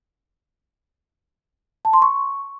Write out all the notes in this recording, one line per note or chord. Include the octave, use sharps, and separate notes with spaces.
A5
C6
C#6